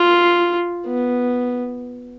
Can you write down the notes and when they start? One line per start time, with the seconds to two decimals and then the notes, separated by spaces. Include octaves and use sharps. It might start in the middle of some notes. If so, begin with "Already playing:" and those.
Already playing: F4
0.87 B3